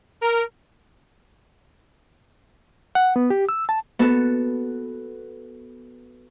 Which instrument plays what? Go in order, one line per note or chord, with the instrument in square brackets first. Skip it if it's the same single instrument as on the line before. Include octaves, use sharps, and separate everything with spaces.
[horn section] A#4
[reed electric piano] F#5
B3
G4
E6
A5
[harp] B3 F#4 A4